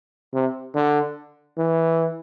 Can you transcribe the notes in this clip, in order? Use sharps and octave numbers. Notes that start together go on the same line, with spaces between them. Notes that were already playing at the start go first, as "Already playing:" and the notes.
C3
D3
E3